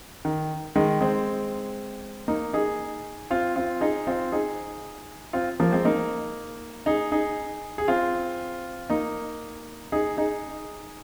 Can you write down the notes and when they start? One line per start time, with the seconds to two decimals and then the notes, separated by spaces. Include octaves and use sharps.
0.25 D#3
0.76 D#3 G#3
1.01 G#3 C4
2.28 A#3 D#4
2.53 D#4 G#4
3.30 C4 F4
3.56 C4 F4
3.81 D#4 G#4
4.07 C4 F4
4.32 D#4 G#4
5.33 C4 F4
5.60 F3 A#3
5.72 G#3 C4
5.85 A#3 D#4
6.86 D#4 G#4
7.12 D#4 G#4
7.78 G#4
7.88 C4 F4
8.90 A#3 D#4
9.92 D#4 G#4
10.17 D#4 G#4